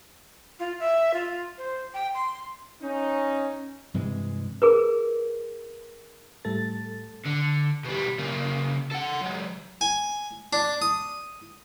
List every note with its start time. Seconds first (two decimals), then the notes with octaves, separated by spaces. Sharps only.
0.59 F4
0.80 E5
1.14 F4
1.58 C5
1.94 G5
2.14 C6
2.82 C#4 D#4
3.94 G2 C3 E3 G#3
4.62 G#4 A#4 B4
6.45 A2 G3 A3 A4 A6
7.26 D3
7.85 B2 G3
8.19 C#3 A#3
8.91 A4 F#5
9.21 F#3 G#3
9.81 G#5
10.53 D4
10.82 D#6